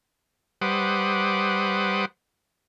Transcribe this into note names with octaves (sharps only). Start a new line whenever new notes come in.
G3 B4 C5 F#5 D6 D#6